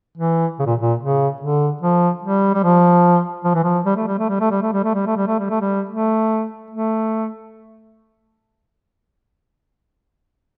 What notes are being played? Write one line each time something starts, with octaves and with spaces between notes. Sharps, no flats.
E3
C#3
A#2
A#2
C#3
D3
F3
G3
G3
F3
F3
E3
F3
G3
A3
G3
A3
G3
A3
G3
A3
G3
A3
G3
A3
G3
A3
G3
A3
G3
A3
A3